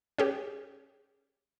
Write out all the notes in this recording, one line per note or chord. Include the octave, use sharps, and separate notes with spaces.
C#4 G4 G#4